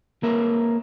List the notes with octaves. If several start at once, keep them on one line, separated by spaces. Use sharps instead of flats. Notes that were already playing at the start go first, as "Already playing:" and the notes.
A#3 A#4 B4 C#5 E5